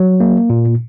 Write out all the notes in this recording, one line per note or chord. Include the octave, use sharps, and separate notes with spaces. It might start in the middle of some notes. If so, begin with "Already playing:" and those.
Already playing: F#3
A#3
A#2